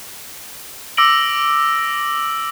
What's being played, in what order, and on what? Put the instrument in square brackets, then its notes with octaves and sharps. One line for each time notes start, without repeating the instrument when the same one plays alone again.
[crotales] D6 E6 A#6 D7 F#7